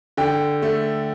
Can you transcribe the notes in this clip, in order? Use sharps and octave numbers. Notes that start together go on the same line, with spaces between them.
D3 G5
A3